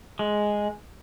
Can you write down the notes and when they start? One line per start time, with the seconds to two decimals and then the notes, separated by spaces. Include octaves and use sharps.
0.19 G#3